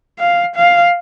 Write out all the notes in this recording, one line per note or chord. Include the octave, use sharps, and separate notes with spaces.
F5
F5